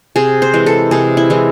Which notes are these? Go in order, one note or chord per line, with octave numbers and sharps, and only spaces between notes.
C3 G#4
C5
E3 G#3
A4
C3 G#4
E4
E3 G#3